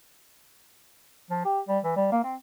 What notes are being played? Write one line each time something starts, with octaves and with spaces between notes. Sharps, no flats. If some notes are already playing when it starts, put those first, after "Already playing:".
F3
G4
G3
E3
G3
A#3
C4